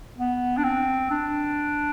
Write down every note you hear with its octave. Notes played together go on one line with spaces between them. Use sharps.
B3
D4
C4
D4